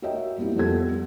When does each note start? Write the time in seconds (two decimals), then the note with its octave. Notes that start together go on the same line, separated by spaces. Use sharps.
0.02 F#4 A#4 C#5 D#5 E5 G5
0.38 G3 A#3 C4 E4 F#4
0.55 F2 G3 B3 F4 A4 G#6